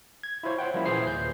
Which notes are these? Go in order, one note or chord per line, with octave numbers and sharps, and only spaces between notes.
G#6
E4 F4 C5 C#5
C5 F#5 G5
F3 G3 A#3 C#4 E4
A#2 E3 G#4 C5 C7
D#2 G6